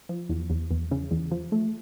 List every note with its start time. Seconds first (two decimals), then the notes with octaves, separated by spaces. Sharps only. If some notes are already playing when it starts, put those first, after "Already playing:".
0.09 F3
0.29 E2
0.50 E2
0.71 E2
0.91 C#3
1.11 E2
1.31 F3
1.52 A3